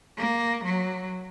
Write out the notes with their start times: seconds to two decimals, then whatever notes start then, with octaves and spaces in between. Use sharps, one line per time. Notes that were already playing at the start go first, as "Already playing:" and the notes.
0.18 A#3
0.65 F#3